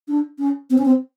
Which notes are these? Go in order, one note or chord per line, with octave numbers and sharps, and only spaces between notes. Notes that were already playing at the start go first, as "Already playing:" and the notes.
D4
C#4
C4
C#4
C4